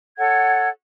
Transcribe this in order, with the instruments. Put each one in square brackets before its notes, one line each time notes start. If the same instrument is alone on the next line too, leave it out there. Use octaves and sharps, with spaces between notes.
[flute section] A4 C#5 F#5 G#6